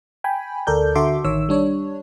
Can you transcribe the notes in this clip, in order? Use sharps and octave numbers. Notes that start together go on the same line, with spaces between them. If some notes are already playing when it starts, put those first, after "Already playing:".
G5 G#5 B5
D2 A4 A#4 D5 G6
D3 F#4 A4 E5 C6 D6
A1 D#3 C#5 E6
G3 D4 C#5